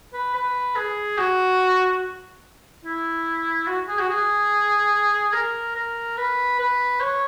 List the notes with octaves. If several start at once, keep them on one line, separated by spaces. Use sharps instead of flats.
B4
B4
G#4
F#4
E4
F#4
G#4
F#4
G#4
A#4
A#4
B4
B4
C#5